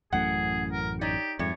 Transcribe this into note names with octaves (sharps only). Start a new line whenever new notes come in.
A1 F#2 A2 G#4 F#5
A#4
D#4 G4 C#5 D5
F2 G#2 G3 A3 C#5